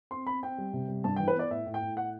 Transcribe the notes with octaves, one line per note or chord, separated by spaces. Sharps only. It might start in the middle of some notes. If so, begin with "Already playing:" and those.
C4 C6
C4 B5
C4 G5
G3
C3
G3
G2 A5
E3 G5
B4
B3 D5
A2 E5
A2
G5
A2
F#5